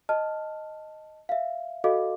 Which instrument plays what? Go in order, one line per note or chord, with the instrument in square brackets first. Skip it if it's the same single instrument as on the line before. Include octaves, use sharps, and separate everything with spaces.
[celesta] D#5 A5 F6
E5 F5
F#4 A4 D#5 F5 D6